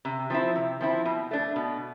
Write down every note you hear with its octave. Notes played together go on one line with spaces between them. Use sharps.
C3
F3 C4 E4
C3
F3 C4 E4
B2
A3 D4
B2